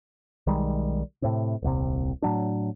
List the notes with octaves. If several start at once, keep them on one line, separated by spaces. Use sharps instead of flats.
B1 D#3 G3 G#3
A2 C3
D#1 C2 C3
A2 F#3 D4